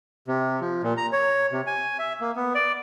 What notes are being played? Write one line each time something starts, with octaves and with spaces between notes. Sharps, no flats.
C3
F3
A#2
A#5
C#5
C3
G#5
E5
A#3
B3
D5